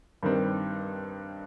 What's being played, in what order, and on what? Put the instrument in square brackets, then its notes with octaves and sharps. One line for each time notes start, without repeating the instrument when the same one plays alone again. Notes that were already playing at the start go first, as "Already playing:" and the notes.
[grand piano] G2 D#3 G3 C4